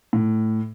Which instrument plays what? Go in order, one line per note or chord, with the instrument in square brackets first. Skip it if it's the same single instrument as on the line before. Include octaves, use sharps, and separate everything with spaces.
[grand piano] A2